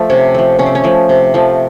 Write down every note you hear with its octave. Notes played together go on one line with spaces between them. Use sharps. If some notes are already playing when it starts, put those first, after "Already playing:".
Already playing: F3 A3
C3 C#4
F3 A3
C3 C#4
C4
C#4
F3 A3
C3
F3 A3